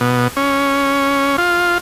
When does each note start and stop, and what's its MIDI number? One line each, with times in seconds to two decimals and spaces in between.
0.01 0.28 47
0.37 1.36 61
1.38 1.78 65